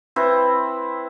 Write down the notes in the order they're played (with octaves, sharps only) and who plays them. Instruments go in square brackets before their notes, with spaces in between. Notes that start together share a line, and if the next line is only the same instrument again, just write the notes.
[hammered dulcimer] C4 E4 B4